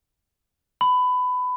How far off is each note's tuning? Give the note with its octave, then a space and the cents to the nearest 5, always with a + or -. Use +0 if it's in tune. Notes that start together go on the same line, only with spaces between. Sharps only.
B5 +20